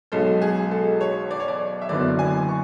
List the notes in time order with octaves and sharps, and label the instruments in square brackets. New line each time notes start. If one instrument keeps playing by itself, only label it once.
[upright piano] B1 B2 G#3 C#4 A4
G#4
A4
C#5
D5
C#5
D5
E5
F#1 F#2 D3 F#3 B3 D5
G#5
C#6